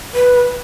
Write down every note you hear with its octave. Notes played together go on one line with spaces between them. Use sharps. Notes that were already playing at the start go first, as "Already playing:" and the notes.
B4